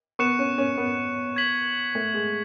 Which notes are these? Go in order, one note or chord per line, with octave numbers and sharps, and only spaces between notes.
B3 C#6 F#6 C#7 E7
C#4
C#4
B3
G#6 B6 F#7
A3
G#3